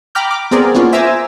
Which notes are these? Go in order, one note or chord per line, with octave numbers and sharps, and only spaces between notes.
G5 A#5 B5 D6 F6 G6
D6
B3 C4 G#4 A#4 D5
A#3 B3 C#4 F4
C5 E5 G#5 A#5 D6 E6